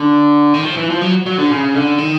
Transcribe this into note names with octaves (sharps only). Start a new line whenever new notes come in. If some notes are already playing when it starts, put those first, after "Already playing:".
Already playing: D3
D#3
F3
E3
F3
F#3
F#3
D3
C#3
D3
D#3